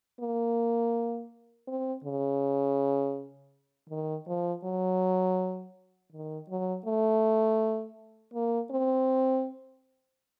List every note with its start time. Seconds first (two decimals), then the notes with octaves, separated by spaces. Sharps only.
0.20 A#3
1.67 C4
2.04 C#3
3.89 D#3
4.26 F3
4.64 F#3
6.12 D#3
6.49 F#3
6.86 A3
8.34 A#3
8.71 C4